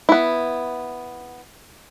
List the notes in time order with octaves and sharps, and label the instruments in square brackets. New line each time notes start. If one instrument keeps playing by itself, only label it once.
[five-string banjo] B3 E4